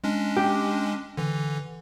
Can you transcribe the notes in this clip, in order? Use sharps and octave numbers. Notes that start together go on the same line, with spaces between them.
G#3 C#4 D4
G4
D3 E3